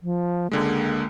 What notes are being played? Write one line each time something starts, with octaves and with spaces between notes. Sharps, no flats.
F3
C#2 D3 G#3 A#3